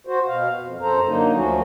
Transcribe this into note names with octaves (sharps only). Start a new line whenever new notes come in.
F#4 C5
B2 F5
F2
F#2 A4 C5 A#5
D3 F#3 A#3 D#4
D2 F3 F#3 A3 C#4 F#4